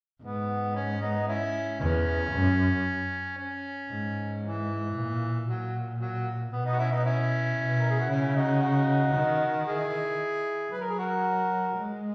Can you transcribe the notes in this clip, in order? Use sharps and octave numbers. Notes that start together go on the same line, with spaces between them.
G#2 B3
C#4
B3 D#4
C#4 E4
E2 C#4
F#2
C#4
G#2
E3
A#2
A#2 F#3
F#3
B2 B3
B3 D#4
F#4
C#4 E4
B3 D#4
C#4 E4
B2
A#4
G#4
F#4
C#3 C#4 E4
D#4 F#4
D#4 F#4
D#3
E4 G#4
F#3 B4
A#4
G#4
F#4 A#4
G#3